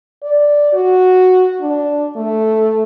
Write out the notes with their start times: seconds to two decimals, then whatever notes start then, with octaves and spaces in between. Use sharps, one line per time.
0.23 D5
0.73 F#4
1.61 D4
2.16 A3